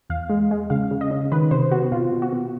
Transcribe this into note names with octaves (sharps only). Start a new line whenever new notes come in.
E2 F5
G#3
G#3
C#3 F5
C#3
D#5
C#3
D#3 B4
C3 C5
B3 F#4
B2 F4
B2
F#4
B2